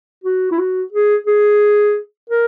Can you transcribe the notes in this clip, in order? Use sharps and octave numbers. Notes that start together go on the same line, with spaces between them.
F#4
E4
F#4
G#4
G#4
A#4